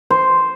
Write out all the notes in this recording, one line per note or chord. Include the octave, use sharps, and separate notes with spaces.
C5